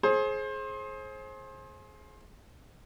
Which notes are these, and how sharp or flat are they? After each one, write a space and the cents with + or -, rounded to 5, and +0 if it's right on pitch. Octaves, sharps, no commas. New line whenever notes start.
G#4 +30 C5 +30